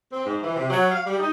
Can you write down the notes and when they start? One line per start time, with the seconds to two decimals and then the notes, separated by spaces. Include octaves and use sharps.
0.12 C4
0.26 G#2
0.43 E3
0.56 C3
0.70 F#3
0.91 F5
1.06 G3
1.19 D#4